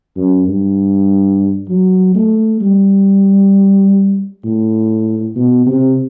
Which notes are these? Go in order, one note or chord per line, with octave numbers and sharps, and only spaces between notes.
F#2
G2
F#3
A3
G3
A2
B2
C3